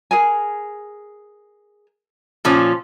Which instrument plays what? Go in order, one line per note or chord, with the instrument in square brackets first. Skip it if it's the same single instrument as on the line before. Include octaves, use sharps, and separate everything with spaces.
[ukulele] G#4 A#4 G#5
[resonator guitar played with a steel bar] A#2 F3 C#4